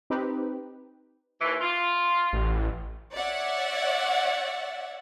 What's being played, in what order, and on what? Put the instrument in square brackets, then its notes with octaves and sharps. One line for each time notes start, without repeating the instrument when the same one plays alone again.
[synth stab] C4 D#4 G4 B4
[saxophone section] D#2 E3
F4
[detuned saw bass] A1
[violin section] C#5 D5 E5 F#5